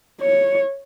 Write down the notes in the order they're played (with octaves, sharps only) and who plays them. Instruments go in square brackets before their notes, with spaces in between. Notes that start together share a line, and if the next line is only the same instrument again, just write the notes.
[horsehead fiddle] C#5